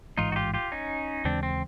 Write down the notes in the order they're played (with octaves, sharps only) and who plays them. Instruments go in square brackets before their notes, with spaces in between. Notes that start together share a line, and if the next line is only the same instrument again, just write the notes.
[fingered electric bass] A1 G#2 E3 G#3 [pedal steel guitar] D#4 F4
[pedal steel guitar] F#4
F4 G4
F4 G4
C#4 D#4
[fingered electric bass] D#2 C#3 E3 G#3 [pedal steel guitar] C4 D4
[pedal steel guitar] C4